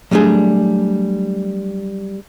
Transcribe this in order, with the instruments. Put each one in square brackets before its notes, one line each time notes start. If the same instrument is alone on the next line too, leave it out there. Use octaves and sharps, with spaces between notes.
[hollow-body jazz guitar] F#3 G3 A3 D4 G#4